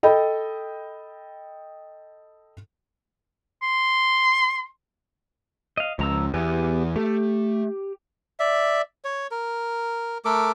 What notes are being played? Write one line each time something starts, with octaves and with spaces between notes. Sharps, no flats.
A4 D#5 G5 B5
C6
D#5 F5
C#2 F3 A#5 E6
E2 B3 G4 G#5
A3 G4
D5 E5
C#5
A#4
A3 A4 A#4 D6